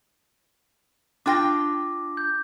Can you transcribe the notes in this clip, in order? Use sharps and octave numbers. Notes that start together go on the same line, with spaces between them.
D4 F4 G5 D6 A#6
G6